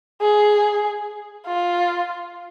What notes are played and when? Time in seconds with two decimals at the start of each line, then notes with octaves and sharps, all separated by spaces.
0.22 G#4
1.47 F4